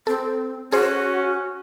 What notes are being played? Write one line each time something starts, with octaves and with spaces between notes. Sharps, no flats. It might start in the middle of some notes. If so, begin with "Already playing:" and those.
C4 A4
C#4 F#4 G#4 C5